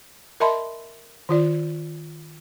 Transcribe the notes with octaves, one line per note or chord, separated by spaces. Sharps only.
A#4 D#5 E5 A5 B5 C6
D#3 F4 D5